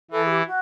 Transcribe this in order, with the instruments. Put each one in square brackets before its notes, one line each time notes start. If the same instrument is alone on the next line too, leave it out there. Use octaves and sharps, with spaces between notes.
[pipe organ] E3 E4 [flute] A4
[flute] G#4
G4
F#4